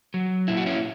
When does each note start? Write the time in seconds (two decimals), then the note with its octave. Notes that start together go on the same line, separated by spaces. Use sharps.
0.14 F#3
0.48 A#2 E4
0.57 F#4
0.66 C#4 E4